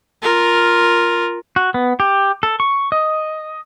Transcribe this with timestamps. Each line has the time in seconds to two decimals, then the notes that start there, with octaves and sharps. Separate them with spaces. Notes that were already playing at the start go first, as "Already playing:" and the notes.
0.23 F4 A#4
1.56 F#4
1.74 B3
2.00 G4
2.43 A4
2.60 C#6
2.92 D#5